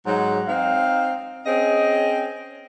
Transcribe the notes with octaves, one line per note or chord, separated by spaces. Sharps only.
G#2 F#3
C4 D#4 F5
C4 C#4 G#4 D#5